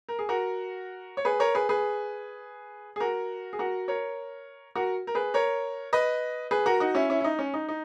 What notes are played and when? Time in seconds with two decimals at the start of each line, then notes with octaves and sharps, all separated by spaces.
0.09 A#4
0.19 G#4
0.29 F#4 A#4
1.17 C#5
1.25 G#4 B4
1.40 A#4 C#5
1.55 G#4 B4
1.69 G#4 B4
2.96 G#4
3.00 F#4 A#4
3.53 G#4
3.59 F#4 A#4
3.88 A#4 C#5
4.75 F#4 A#4
5.07 A#4
5.15 G#4 B4
5.34 A#4 C#5
5.93 B4 D#5
6.51 G#4 B4
6.66 F#4 A#4
6.80 D#4 F#4
6.95 C#4 E4
7.10 C#4 E4
7.20 E4
7.24 D#4
7.39 C#4
7.54 D#4
7.69 D#4